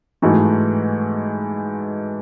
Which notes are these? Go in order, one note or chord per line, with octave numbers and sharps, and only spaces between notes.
G#2 E3 A3 D#4 F#4